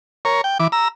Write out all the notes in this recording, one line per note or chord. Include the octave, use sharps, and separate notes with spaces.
A#4 C#5
G5
E3 D6
A#5 E6